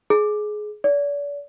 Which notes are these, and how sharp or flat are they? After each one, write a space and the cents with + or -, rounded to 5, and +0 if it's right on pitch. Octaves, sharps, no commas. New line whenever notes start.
G#4 +20
D5 -40